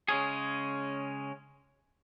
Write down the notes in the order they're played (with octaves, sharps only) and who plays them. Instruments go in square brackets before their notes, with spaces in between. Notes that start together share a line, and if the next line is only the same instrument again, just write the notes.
[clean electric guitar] C#3 G#3 C#4 G#4